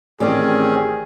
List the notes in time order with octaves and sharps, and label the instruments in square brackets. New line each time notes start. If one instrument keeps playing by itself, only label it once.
[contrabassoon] A1 [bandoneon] D#3 C4 C#4 [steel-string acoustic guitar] G4 D5 D#5 [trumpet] G#4